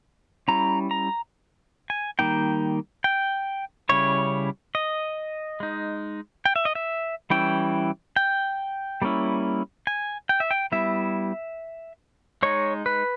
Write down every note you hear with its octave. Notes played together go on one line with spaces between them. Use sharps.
G3 C#4 E4 A#5
A#5
G#5
D#3 G3 A#3 D#4 G5
G5
C#3 G3 C#4 E4 C#5
D#5
G#3 D#4
G5
E5
D#5
E5
E3 G3 C#4 E4 G5
G5
G3 A#3 C#4 E4
G#5
G5
E5
G5
G3 B3 E4 E5
G#3 D#4 C#5
B4